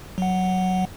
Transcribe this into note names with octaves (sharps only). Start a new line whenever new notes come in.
F#3 F#5